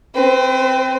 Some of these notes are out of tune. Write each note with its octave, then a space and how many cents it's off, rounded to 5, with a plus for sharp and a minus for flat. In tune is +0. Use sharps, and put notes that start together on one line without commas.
C4 +0 B4 +40